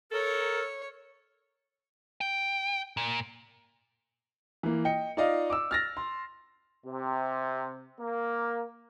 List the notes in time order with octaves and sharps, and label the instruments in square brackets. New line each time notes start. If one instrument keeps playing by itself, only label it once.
[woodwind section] A4 A#4 [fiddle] C#5
[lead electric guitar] G5
A#2
[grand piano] E3 A#3
D#5 G5 C#7
D#4 F4 D5 D#5 F5
D6 E6
F6 A6 A#6
C6
[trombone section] C3
A#3